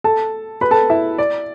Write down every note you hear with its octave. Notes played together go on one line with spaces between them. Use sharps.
A4 A5
B4 B5
A4 A5
E4 E5
D5